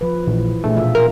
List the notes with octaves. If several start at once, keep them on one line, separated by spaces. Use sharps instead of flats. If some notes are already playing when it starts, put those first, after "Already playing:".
F3 B4
A#1 E3
A#2 A3 D4 G#4
B2 F4 E5
A#4